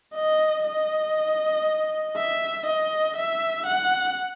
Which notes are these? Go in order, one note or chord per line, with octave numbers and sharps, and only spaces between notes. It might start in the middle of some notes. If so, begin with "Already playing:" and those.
D#5
D#5
E5
D#5
E5
F#5